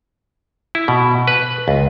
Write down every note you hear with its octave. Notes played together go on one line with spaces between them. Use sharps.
E4
B2
B4
C#2